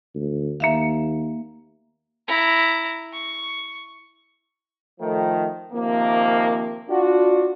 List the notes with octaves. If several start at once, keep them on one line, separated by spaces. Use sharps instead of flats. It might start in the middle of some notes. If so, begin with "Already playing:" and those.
D2
D#2 A#3 E5 F5
E4 A#5
C#6
D#3 F3 A3
C3 D#3 F3 A#3
D4 F4 F#4